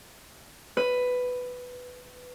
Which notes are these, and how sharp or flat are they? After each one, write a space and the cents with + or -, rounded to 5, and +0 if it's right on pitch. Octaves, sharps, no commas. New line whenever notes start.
B4 +10